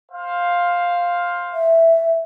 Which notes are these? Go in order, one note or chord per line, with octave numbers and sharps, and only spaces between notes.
C5 F5
E5